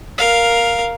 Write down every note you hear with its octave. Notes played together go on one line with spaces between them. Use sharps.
A#4 F5